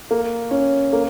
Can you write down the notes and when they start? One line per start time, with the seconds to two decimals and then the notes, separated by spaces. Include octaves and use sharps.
0.11 A#3
0.51 C#4
0.93 A#3